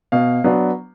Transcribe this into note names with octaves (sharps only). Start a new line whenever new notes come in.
B2 F5
F#3 B3 D4